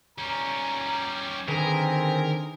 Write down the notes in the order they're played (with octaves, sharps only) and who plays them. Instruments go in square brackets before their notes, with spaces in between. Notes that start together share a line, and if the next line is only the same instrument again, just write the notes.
[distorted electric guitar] G3 C#4 [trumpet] A#5
[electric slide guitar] D3 D#3 B4 [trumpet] C4 [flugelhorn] G#4 [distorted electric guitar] A#4